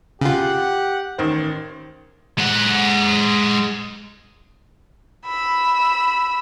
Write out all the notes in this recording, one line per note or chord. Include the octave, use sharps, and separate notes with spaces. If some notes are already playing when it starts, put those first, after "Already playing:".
C#3 F4 G4 F#5
A1 D#3 C5
G#3 F#5
B5 E6